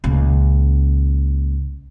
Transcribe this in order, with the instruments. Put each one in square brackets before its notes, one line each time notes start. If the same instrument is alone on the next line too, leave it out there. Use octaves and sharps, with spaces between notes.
[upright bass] C#2 A#2